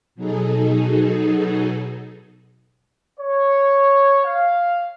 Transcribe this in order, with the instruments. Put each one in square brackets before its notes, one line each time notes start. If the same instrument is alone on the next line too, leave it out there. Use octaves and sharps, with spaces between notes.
[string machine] B2 F#3 D#4 G#4 A4
[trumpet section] C#5
F5